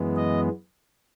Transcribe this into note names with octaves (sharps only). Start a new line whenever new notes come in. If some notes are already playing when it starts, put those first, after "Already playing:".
Already playing: F#2 E3 G#3 B3
D#5